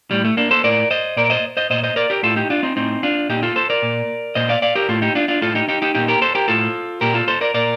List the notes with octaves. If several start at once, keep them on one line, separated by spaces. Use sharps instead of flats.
A2 G3
A3
A#3 D4
A4 C5
A2 A#4 D5
C5 D#5
A#2 A#4 D5
C5 D#5
C5 D#5
A#2 C5 D#5
C5 D#5
A#4 D5
G4 A#4
A2 F4 A4
D#4 G4
D4 F4
C4 D#4
A2 C4 D#4
D4 F4
A#2 D#4 G4
F4 A4
A4 C5
A#4 D5
A#2
A#2 C5 D#5
D5 F5
D5 F5
G4 A#4
A2 F4 A4
D#4 G4
D4 F4
D4 F4
A2 F4 A4
D#4 G4
D#4 G4
D#4 G4
A#2 D#4 G4
G4 A#4
A4 C5
G4 A#4
A2 F4 A4
A#2 G4 A#4
F4 A4
A4 C5
A#4 D5
A#2 A#4 D5